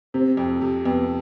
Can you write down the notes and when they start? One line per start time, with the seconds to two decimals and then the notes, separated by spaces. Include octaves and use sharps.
0.14 C3 C4
0.37 F2
0.61 C3
0.85 F2 B3